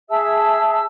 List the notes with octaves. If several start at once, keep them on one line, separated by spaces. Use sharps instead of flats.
G#4 E5 A5 E6